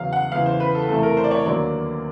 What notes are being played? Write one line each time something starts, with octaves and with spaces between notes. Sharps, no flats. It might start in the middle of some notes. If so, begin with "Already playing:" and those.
Already playing: E2 C#3 F#3 F5
F#5
E2 C#3 E3 F5
C5
B4
A4
E2 C3 E3 A3 A4
A#4
C5
D5
C#5
D#2 D3 F#3 A#3 D5